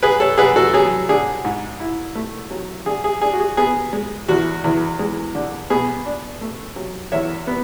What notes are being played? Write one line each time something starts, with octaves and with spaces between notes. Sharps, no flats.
F#2 G#4 B4
A4 C#5
F#2 G#4 B4
F#4 A4
F#3 G#4
D3 G#4
G#2
E4
A3
F#3
D3 G#4
G#4
D4 G#4
F#4
G#4
B3 G#4
G#3
E2 F#4
E2
G#3
D3
B2 G#4
D4
A3
F#3
E2 C#5 E5
B3